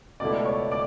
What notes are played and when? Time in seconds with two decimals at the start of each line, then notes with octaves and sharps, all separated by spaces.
0.20 C#2 B2 A3 E4 D5 D6
0.45 C#5 C#6
0.72 D5 D6